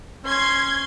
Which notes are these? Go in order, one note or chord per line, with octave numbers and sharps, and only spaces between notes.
C#4 C6 G#6